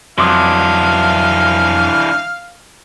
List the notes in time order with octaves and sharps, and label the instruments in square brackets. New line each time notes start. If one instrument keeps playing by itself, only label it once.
[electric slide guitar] F2 F#3 [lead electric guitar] E3 D4 [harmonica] F5 [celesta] C6 D6 D#6